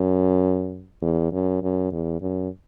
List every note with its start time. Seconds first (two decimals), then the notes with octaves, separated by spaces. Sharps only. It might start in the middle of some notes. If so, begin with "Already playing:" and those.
Already playing: F#2
1.02 E2
1.32 F#2
1.62 F#2
1.91 E2
2.21 F#2